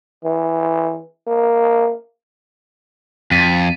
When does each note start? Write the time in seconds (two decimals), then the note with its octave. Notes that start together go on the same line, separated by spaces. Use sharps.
0.25 E3
1.27 A#3
3.31 F2 A6 B6 D#7